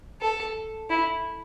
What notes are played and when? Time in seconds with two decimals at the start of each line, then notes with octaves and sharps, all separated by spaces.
0.21 A4
0.90 E4